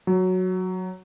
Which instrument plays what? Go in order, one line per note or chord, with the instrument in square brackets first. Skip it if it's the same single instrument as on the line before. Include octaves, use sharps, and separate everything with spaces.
[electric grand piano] F#3